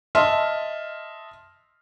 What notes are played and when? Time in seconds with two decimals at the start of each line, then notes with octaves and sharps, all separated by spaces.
0.15 D#5 E5 A5 C6 F6